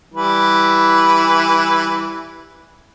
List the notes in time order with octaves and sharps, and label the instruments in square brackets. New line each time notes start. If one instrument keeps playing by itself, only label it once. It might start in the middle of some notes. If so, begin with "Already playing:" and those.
[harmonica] E3 G3 B4